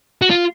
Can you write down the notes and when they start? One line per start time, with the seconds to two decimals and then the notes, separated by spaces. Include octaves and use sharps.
0.22 F#4
0.30 F4